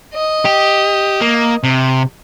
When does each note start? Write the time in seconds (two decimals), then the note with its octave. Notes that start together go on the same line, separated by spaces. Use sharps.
0.14 D#5
0.45 G4
1.21 A#3
1.63 C3